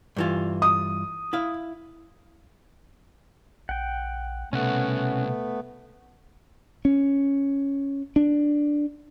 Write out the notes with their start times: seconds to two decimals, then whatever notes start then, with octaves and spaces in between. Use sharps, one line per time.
0.17 G2 E3 F4
0.62 D#6
1.33 E4 F5
3.69 A#1 F#5 G5
4.53 C2 B2 A3 B3 C#4 F#5
6.85 C#4
8.16 D4